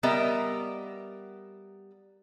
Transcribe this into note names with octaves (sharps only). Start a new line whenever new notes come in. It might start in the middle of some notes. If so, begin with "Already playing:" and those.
G3 B3 A#4 D#5 E5